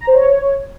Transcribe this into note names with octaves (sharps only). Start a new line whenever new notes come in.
A#5
C5
C#5